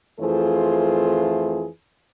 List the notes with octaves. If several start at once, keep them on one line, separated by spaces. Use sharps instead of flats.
F2 E3 A3 F4 G#4 C5